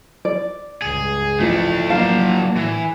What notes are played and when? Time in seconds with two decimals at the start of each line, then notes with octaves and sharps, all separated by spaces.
0.25 D5
0.82 C#2 G2 G#4
1.40 A1 F3 A3 D4
1.90 F#3 A#3 D4 F5 A5
2.57 A2 E3